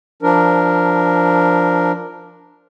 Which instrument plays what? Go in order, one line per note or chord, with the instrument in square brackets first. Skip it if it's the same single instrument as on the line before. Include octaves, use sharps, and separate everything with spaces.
[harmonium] F3 D4 A#4